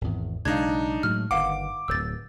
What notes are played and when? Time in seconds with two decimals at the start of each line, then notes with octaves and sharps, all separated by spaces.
0.01 G#1 E2
0.45 B1 C#3 G#3 D4 D#4 F5 G#6
1.03 A2 F#3 G#3 F6
1.31 G1 G2 D#3 F5 F#5 D6
1.88 D1 E6 G6 A6